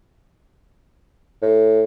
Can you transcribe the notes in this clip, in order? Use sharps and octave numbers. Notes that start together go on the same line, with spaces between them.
A2